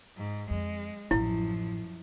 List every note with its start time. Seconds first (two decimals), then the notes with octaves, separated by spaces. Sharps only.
0.17 G#2
0.50 F2 G#3
1.11 A1 F#2 F3 E4